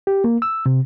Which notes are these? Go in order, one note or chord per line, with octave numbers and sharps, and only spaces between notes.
G4
A#3
E6
C3